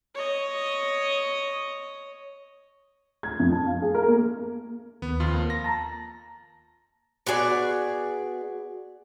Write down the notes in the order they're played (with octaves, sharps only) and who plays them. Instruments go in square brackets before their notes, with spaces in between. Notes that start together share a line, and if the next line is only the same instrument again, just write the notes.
[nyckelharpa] C#5 D#5
[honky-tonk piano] G#6
F2
A5
F5
G#4
A#4
A#3
[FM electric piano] D#2 [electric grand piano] B3
[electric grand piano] F2 F4
[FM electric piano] A#3
[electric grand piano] A#6
[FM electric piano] A5 A#5
[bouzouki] B3 F#4 G#4 D5